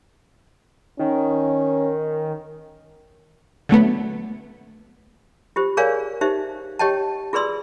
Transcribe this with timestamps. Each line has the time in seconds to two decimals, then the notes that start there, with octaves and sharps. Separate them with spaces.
0.99 D#3 C#4
3.69 D3 F#3 A3 B3
5.56 F4 G4 C5
5.77 G#4 A#4 C#5 D5 F5 G#5
6.21 D#4 G4 C5 E5
6.79 G4 C#5 D#5 G5 A5
7.33 F4 G#4 B4 D5 C6 E6